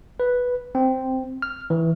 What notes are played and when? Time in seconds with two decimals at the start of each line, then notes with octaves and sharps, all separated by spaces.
0.20 B4
0.75 C4
1.42 F6
1.70 E3